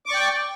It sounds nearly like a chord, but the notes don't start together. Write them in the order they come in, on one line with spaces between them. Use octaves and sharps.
D6 C#6 D5 G5